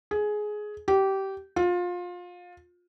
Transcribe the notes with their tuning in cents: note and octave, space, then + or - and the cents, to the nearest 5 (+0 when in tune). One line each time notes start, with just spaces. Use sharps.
G#4 +15
G4 -20
F4 +25